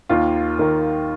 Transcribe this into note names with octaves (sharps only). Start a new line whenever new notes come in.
D#2 D#3 A#3 F4
D#2 D#3 A#3